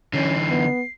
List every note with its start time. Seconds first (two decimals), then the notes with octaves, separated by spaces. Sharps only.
0.13 D3 E3 C#4 C7
0.49 B3